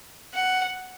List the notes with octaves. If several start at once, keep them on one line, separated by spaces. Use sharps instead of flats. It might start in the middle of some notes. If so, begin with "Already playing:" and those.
F#5